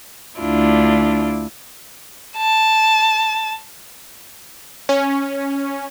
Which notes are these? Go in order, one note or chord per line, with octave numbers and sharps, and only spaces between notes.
D2 D4 E4 F4 D5
A5
C#4